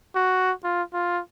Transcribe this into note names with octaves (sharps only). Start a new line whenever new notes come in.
F#4
F4
F4